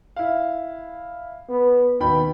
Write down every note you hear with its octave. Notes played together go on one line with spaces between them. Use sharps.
E4 F5
B3
D#2 B2 G5 B5